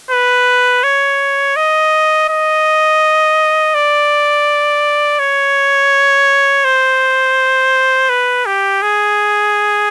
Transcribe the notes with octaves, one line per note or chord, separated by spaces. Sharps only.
B4
C#5
D#5
D#5
D5
C#5
C5
B4
G4
G#4